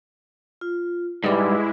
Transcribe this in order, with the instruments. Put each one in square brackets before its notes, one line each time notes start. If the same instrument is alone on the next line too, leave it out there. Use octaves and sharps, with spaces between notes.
[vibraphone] F4
[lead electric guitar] G#2 G3 [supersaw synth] G#3 E4 [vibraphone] B4 D6